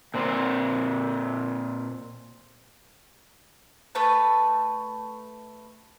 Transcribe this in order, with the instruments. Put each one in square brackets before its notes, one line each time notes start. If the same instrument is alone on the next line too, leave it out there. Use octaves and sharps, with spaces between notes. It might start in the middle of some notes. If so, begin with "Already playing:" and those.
[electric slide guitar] A#2 C4
[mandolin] A3 B4 A5